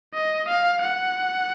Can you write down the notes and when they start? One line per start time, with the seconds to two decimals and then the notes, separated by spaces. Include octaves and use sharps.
0.14 D#5
0.48 F5
0.81 F#5